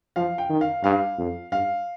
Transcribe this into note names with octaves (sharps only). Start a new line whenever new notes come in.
F3 F5
G5
D#3
F5
G2 F5
F2
G2 F5